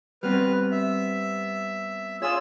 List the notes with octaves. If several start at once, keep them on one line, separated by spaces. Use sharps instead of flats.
G3 B3 C4 B4 F6
E5
F4 G#4 C#5 G#5 E6